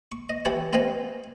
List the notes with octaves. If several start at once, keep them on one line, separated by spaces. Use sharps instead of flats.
C#6
D#5
E3 E4 G4 C#5 F#5 A5
C4 B4 D#5 F5 F#5 G#5